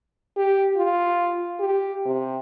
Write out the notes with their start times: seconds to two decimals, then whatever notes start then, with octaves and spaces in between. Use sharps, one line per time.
0.37 G4
0.77 F4
1.60 G4
2.05 C3